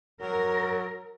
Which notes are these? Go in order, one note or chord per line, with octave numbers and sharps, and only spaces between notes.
F#3 A#4